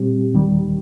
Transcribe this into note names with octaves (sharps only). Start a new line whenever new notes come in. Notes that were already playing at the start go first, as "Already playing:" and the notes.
Already playing: A#2 G3 C4 G4
D#2 D#3 G3